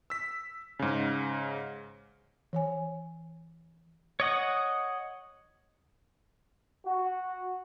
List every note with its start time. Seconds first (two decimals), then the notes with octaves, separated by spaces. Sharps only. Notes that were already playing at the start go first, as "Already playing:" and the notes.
0.10 E6 B6
0.79 G#2 C#3
2.53 E3 C#5 G#5
4.20 C#5 D#5 F#5 D#6
6.86 F#4